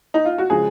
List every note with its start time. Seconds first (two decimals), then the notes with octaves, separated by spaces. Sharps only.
0.14 D#4
0.25 F4
0.38 F#4
0.50 C#3 F3 G#3 G#4